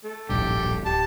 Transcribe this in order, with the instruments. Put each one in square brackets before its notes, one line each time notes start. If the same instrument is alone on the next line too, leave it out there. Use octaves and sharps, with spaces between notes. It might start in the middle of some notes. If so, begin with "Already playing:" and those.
[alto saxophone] A3
[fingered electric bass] D1 A#1 G2 [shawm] G4
[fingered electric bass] D1 [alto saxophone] G4 [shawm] A5